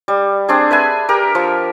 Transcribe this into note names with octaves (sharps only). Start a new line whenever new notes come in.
G3
C4 D4 G#4
B4 E5 G#5
G4 A#4
F3